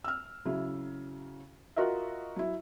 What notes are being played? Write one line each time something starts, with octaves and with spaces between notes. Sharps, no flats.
E6 F6
C#3 F#3 E4
F4 F#4 A#4 D#5 E5
F#3 E4